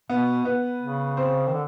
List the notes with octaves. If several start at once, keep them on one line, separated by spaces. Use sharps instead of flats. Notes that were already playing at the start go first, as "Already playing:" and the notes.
B2 B3 B4
B3 B4
C#3
C4 C5
D#3
D3